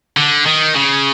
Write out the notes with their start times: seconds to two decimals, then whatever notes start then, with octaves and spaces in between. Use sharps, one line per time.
0.17 D3
0.46 D#3
0.75 C#3